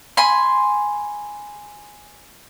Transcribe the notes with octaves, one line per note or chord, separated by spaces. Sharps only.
G#5 B5 C6